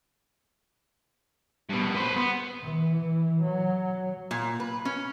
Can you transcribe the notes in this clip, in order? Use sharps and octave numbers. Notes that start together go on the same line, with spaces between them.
G2 B2
B4 C5
B3
E3
F#3
A#2
B4
C#4